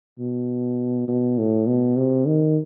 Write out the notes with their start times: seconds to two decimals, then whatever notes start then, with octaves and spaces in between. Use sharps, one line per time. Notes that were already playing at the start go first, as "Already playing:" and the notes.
0.19 B2
1.08 B2
1.38 A2
1.67 B2
1.97 C3
2.27 D#3